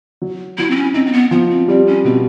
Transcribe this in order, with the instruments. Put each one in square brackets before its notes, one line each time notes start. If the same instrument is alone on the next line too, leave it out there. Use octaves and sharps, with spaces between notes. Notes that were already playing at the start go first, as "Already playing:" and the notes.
[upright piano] F#3
[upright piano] F#3 [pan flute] E4
[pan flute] C4
C#4
[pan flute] C4 [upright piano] D#4
[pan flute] C4
B3
[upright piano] F3 [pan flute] B3
[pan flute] C4
[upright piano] G3 [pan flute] C4
[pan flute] C#4
[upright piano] B2 [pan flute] C4